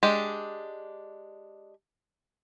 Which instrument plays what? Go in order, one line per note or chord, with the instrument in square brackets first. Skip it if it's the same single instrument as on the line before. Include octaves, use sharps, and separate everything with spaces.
[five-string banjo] G#3 D4 G4